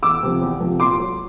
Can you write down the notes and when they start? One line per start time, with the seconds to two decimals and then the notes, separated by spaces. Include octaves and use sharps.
0.03 E2 D6 E6
0.23 C3 F3
0.42 E2
0.60 C3 F3
0.80 A#2 C6 D6
1.00 F#3